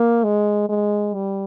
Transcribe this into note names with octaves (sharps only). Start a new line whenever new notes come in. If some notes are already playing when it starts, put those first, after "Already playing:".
Already playing: A#3
G#3
G#3
G3